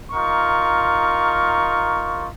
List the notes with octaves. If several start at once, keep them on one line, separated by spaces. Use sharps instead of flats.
D#4 F4 A#4 C#6